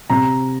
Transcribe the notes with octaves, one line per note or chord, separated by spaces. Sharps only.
C3 A#5